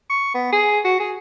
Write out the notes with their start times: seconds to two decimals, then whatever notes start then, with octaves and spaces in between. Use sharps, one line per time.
0.10 C#6
0.34 B3
0.52 G#4
0.84 F#4
1.00 G#4